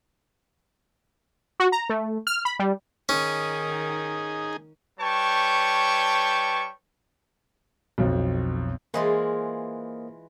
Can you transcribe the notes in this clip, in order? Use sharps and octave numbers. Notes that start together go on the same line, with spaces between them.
F#4
A#5
A3
F6
B5
G3
D#3 C#4 D#4 G#4
G3 B4 C#5 G5 A5 C#6
B1 F2
E3 G#3 A#3 F4 C5 D#5